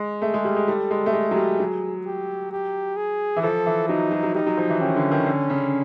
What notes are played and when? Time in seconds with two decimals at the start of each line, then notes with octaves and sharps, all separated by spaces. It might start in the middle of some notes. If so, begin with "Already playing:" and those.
Already playing: G#3
0.22 A3 G#4
0.34 G#3
0.45 G3
0.56 G#3
0.68 G3 A4
0.91 G#3
1.06 A3
1.13 G#3 G#4
1.31 F#3
1.36 G3
1.60 F#3
2.06 G4
2.52 G4
2.97 G#4
3.36 E3
3.43 F3 A4
3.66 E3
3.89 F#3 D#4
4.11 F#3
4.23 F#3
4.34 G3 D#4
4.47 F#3
4.57 F3
4.69 E3
4.80 D#3 C#4
4.96 D3
5.11 D#3
5.26 D3
5.50 C#3